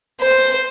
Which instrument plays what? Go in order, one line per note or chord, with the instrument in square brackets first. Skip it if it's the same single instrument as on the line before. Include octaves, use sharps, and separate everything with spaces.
[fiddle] C5